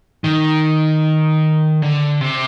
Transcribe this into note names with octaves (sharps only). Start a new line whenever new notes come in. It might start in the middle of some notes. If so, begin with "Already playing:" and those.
D#3
D3
C3